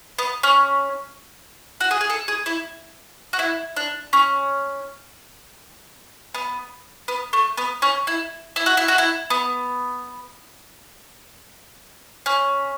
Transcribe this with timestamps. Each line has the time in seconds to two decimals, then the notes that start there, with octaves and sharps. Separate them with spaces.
0.18 B3
0.43 C#4
1.80 F#4
1.91 G#4
2.01 G#4
2.10 A4
2.28 G#4
2.46 E4
3.33 F#4
3.39 E4
3.76 D4
4.13 C#4
6.34 B3
7.08 B3
7.33 A3
7.57 B3
7.82 C#4
8.07 E4
8.56 E4
8.66 F#4
8.77 E4
8.88 F#4
8.98 E4
9.30 B3
12.26 C#4